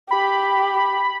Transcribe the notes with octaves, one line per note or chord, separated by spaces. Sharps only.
G4 B5